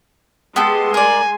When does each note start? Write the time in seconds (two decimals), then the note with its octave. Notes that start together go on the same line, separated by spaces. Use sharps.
0.56 G#3 B3 G4 A4 C6
0.94 A#4 D5 G#5